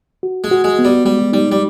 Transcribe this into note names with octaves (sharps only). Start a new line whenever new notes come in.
F#4
G#3
F#4
G#3
B3
G3
G3 G#3
G3 D#4
G3